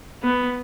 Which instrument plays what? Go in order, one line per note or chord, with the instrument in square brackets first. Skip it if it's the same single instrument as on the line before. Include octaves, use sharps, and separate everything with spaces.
[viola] B3